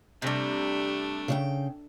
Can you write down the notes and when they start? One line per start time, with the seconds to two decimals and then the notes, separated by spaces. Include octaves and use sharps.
0.22 C3 G3 A3 D4
1.28 C#3 D5 G5